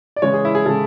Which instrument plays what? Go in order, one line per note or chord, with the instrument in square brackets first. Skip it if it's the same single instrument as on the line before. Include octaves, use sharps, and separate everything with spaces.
[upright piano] D5
C#3 E3 G#3 C#5
G#4
E4
G#4
C#3 E3 G#3 A4